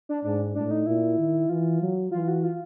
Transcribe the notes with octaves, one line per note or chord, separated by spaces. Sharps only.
D4
G#2 D4
A2 D4
D#4
A#2 E4
D#3
E3 F4
F#3
E3 F4
F#4
F4